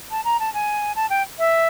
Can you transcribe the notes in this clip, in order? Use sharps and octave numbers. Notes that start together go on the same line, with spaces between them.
A5
A#5
A5
G#5
A5
G5
E5